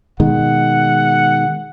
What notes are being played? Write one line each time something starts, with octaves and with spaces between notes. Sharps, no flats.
B2 D#3 G#3 F#5